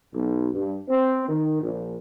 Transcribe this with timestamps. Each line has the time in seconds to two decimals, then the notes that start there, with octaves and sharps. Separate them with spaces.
0.14 B1
0.53 G2
0.87 C4
1.28 D#3
1.62 A#1